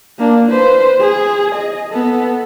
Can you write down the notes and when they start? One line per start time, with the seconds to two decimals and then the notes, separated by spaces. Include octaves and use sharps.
0.19 A#3 D4
0.51 B4 C5
1.00 G#4
1.55 D#5
1.90 B3 A4